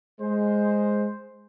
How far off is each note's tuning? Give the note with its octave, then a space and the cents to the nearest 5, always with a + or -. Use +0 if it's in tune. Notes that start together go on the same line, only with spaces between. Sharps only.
G#3 +0 C5 +0